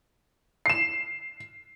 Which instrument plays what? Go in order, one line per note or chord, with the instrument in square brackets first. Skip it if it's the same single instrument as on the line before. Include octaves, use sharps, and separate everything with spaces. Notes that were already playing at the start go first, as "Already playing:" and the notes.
[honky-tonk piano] C7 E7